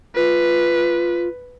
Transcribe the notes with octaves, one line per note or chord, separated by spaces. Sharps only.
F4 B4